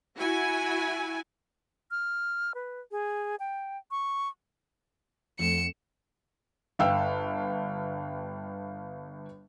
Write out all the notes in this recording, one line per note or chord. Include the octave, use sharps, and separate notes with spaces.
E4 F#4 G#5
F6
B4
G#4
G5
C#6
F2 A3 C#7 E7
G1 F5 G5 E6